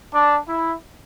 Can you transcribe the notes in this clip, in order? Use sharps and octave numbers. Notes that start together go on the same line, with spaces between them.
D4
E4